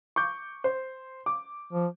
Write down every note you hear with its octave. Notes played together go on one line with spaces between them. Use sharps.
C#6 D6 G6
C5
D6
F3